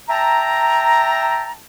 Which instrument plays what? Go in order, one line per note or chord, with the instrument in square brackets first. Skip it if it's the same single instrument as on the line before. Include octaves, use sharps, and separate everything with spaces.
[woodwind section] E5 G5 A5 A#5